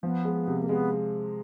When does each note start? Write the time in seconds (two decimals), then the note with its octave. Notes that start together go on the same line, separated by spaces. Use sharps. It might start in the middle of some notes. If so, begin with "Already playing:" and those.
0.03 F3 B3
0.25 G#3
0.48 C3
0.63 A#3
0.69 G#3 B3